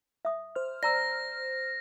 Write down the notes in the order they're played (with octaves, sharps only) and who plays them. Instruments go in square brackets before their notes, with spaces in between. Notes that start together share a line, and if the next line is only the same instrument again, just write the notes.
[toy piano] E5 D#6
[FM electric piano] C5 F6
[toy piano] D5 A#5 E6 [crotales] A#6